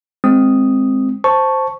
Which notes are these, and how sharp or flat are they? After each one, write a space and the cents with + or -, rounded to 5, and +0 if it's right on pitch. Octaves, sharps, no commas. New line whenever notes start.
G#3 +0 C4 +0 D#6 +0
C5 +0 A5 +0 C#6 +0